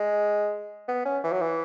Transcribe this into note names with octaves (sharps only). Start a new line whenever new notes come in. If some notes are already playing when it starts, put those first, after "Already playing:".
Already playing: G#3
B3
C#4
E3
F#3
E3